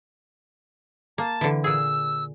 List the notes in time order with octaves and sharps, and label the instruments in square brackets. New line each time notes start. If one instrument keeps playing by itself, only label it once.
[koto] A#3 [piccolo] A5
[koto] D3 E3
[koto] A#2 G#4 [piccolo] E6